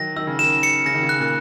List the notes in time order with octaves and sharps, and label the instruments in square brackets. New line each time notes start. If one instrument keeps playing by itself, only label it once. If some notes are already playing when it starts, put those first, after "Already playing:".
Already playing: [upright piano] D#3 F#3 [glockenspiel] A#6
[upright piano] D#3 [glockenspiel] E6
[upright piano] C#3
[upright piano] D#3 [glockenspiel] E7
[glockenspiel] C#7
[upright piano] C#3 [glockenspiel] A#6
[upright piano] D#3
C#3
[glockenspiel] F#6
[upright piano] A#2